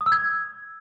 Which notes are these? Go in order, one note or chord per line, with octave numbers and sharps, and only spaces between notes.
D#6
E6
G#6